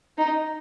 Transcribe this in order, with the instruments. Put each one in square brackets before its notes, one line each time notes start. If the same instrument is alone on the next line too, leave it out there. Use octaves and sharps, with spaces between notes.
[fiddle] D#4